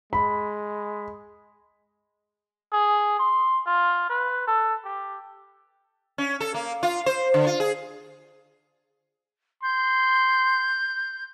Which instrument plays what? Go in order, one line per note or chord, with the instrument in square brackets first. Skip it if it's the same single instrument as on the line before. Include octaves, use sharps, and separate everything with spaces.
[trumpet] G#3 [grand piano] B5
[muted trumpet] G#4
C6
F4
B4
A4
G4
[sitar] C#4
A4
A#3
F4
C5
D3
F4
G#4
[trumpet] C6 [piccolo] G6